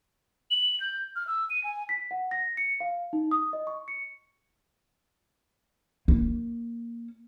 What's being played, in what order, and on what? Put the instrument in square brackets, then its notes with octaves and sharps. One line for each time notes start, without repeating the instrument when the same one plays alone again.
[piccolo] F#7
G6
F6
E6
D#7
G#5
[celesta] B6
F#5
A#6
C#7
F5
D#4
D#6
D#5
C#6
C#7
[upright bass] A#3